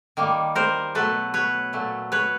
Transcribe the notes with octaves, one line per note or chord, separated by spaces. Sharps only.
D#3 G3 A#3
A#4 C5
B2 F#3 A3 A4 B4
B4 C#5
A#2 F#3 A3
B4 C#5